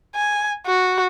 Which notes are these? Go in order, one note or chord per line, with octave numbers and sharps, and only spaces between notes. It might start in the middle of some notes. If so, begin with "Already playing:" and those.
G#5
F#4